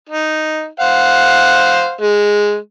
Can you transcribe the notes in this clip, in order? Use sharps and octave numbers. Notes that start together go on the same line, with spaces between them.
D#4
C5 F5 F#5
G#3